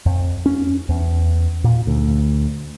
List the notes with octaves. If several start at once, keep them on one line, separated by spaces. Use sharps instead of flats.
F2
C#4
E2
A#2
D2